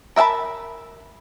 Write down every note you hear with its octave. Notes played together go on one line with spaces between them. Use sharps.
A#4 E5 F#5 A5 B5